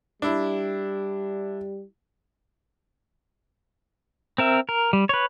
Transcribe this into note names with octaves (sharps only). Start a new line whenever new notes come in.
G3 D4 E4
C4 A#4 E5
A#4
G3
B4 C#5